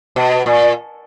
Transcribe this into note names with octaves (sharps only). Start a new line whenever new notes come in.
B2
A#2